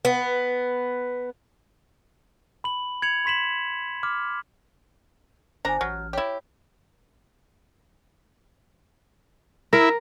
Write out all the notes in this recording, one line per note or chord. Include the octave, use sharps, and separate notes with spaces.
B3
B5 F#7
G#6 C#7 F7 F#7
B5 C6 B6 E7 F#7
D6 F6
G1 D4 C5 G#5 A#5
A1 F#3 F6
E4 G4 C#5
E4 A#4